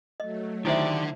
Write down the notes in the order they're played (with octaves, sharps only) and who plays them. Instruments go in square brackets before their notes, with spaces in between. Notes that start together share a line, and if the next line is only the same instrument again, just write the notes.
[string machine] F#3 A3 [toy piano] D#5
[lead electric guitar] D3 [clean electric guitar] D#3 G4 D5 [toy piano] E4 C5 E5